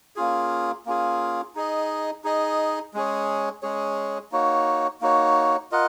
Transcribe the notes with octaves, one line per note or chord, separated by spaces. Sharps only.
A#3 C#4 F4 G#4
A#3 C#4 F4 G#4
D#4 G#4 D#5
D#4 G#4 D#5
G#3 C#4 G#4 C#5
G#3 C#4 G#4 C#5
A#3 D#4 F#4 C#5
A#3 D#4 F#4 C#5
F4 A#4 D#5 F#5